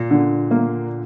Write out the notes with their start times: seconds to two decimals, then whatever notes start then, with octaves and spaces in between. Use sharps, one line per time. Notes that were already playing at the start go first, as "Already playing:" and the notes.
Already playing: A#2
0.11 D3
0.51 A#3